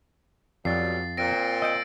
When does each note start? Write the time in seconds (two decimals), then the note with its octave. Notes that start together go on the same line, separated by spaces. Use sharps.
0.65 F2 B2 F#3 G3 A6 C7
1.17 A#2 C4 A#6 D7
1.62 D#5 E6 G6 D7